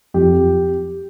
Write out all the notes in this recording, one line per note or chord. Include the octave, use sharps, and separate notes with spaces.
F2 G4